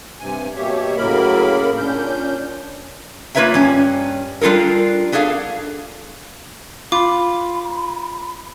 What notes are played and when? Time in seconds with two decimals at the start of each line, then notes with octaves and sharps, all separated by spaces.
0.20 G2 C3 G#5
0.56 B2 A#3 G4 C#5 E5
0.97 A2 C#3 F#3 A#3 A#4 B5
1.78 A#2 C#4 D4 G6
3.35 A#3 F4 B4 C#5 E5 A#5
3.54 G2 C#4
4.41 G3 D4 F4 A4 A#4
5.12 B3 D4 G#4 A4 F5
6.92 F4 B5 D6